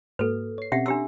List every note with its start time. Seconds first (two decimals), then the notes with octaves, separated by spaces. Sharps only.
0.19 G#2 A#3 F#4 A4 B4
0.58 C#5 C7
0.72 B2 C4 C#4 G4 E5 F#5
0.86 D4 G4 A#5 C6 E6